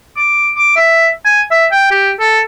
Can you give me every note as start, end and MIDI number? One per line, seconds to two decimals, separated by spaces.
0.17 0.50 86
0.56 0.76 86
0.77 1.09 76
1.25 1.42 80
1.51 1.66 76
1.72 1.86 79
1.91 2.10 67
2.20 2.40 69